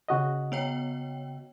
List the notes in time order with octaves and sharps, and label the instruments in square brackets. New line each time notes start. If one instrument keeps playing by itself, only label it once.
[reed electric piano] C#3 F#4 D#5
[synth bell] B3 C#5 G5